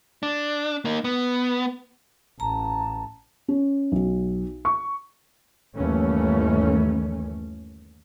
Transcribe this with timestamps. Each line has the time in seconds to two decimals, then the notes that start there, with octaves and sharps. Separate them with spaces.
0.23 D4
0.85 A#3 D#4
1.04 B3
2.40 A1 A5 A#5
3.48 C#4
3.92 B1
4.65 C#6
5.77 G1 D#2 E3 A3 C#4